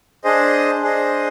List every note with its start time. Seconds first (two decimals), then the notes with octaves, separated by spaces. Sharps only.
0.24 D4 G#4 C5 D#5
0.82 D4 G#4 C5 D#5